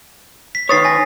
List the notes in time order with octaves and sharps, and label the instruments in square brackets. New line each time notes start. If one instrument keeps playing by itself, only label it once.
[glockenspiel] B6
[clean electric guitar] D#3 B4 C#5 [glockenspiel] D#6 A6 C7
[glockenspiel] G#5 A#6